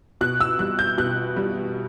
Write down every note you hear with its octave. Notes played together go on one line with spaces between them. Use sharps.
B2 F#6
E6
G3 F#6
G6
B2 F#6
G3